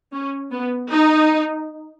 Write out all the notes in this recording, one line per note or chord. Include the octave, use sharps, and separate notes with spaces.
C#4
B3
D#4